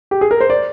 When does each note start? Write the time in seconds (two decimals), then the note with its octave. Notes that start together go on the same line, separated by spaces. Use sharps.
0.11 G4
0.21 G#4
0.31 A#4
0.41 C5
0.50 D5